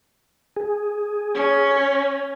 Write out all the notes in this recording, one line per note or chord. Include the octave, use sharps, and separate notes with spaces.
G#4
C#4